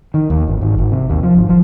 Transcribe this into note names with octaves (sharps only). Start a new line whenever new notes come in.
D#3
D#2
G1
G#1
G#1
C3
D#2
F3
G#1
F3